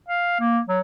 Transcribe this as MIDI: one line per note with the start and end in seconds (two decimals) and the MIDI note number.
0.08 0.39 77
0.40 0.59 58
0.68 0.80 54